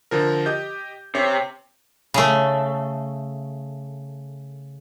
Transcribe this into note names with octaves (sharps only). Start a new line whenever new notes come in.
D3 F3 A#4
G4 D#5 G6
C3 C#5
C#3 A3